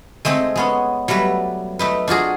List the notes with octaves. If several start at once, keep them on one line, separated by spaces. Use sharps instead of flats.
G#3 A3 C4 D#4 G#4
G#3 B3 C#4
F#3 G3 A3 B4
A3 D#4 B4
D4 F4 F#4 G#4